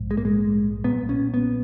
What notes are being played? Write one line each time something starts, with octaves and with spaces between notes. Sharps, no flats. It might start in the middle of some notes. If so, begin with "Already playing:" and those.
Already playing: A#1 G#2
G#3
A#3
G#3
B1 A#2 B3
C#4
B3